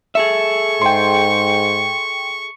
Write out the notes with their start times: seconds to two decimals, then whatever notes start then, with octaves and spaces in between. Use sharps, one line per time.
0.15 G#4 A4 E5 C#6
0.82 G#2 G5 C6